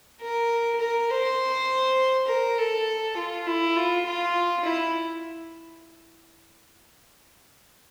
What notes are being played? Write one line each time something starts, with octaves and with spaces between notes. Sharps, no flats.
A#4
A#4
C5
A#4
A4
F4
E4
F4
F4
E4